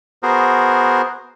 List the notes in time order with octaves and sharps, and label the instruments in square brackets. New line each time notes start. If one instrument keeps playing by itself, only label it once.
[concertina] B3 F#4 G#4 A#4 C5